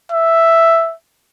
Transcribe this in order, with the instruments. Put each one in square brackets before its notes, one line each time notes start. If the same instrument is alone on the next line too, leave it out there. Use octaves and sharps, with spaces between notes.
[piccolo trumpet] E5